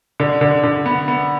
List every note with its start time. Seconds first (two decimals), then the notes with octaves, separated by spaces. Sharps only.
0.20 D3
0.41 D3
0.63 D3
0.86 B3
1.08 B3